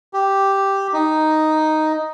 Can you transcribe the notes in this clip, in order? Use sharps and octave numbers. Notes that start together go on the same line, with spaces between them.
G4
D#4